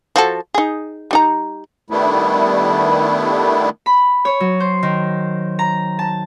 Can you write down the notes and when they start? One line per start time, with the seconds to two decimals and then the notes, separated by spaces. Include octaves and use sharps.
0.16 F3 F#4 A4
0.54 D#4 G#4
1.11 G3 D#4 A#5
1.90 D#3 G3 A3 B3 D4 E4
3.86 B5
4.25 C#5
4.40 F#3
4.60 C5
4.83 D#3
5.59 A#5
5.99 A5